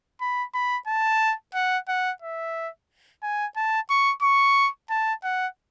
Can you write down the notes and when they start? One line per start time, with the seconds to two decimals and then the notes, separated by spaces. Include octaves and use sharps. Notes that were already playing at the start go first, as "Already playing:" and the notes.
0.21 B5
0.54 B5
0.87 A5
1.54 F#5
1.88 F#5
2.22 E5
3.23 G#5
3.56 A5
3.90 C#6
4.23 C#6
4.90 A5
5.24 F#5